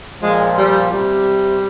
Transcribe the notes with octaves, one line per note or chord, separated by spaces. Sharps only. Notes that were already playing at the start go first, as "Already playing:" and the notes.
A#2 F3 G#3
G3
C3 G3